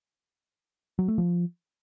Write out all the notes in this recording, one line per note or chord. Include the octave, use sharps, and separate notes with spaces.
F#3
A3
F3